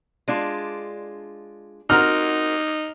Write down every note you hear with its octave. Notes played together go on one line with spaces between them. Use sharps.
G#3 D4 F4
C4 D#4 F#4 A#4 F6